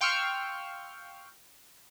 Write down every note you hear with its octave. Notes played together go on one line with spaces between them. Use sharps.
F5 G5 C6 C#6 E6 F6